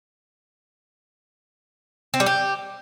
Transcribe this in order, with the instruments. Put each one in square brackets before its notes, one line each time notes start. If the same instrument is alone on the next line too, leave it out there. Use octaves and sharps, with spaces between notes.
[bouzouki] C4
G3
G4